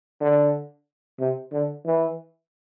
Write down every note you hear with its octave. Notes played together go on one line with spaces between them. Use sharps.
D3
C3
D3
E3